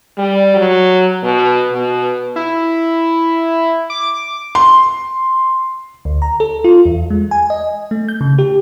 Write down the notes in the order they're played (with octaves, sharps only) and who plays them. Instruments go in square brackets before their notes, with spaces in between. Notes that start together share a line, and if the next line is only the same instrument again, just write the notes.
[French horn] G3
F#3
B2
B2
[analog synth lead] E4
D6
[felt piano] C6
[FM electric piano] D2
A#5
A4
F4
E2
G#3
G#5
D#5
A3
G6
C#3
G4